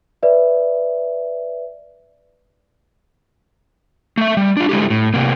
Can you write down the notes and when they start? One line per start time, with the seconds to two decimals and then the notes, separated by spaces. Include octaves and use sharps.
0.23 B4 D5 E5
4.17 A3 E5
4.37 G3
4.57 D4 F4
4.69 G#3 A3 E4 G4
4.90 A2
5.14 C3 A#3